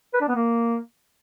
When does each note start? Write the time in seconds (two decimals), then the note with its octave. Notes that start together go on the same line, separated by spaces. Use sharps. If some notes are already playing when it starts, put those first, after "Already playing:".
0.14 B4
0.21 D4
0.28 B3
0.36 A#3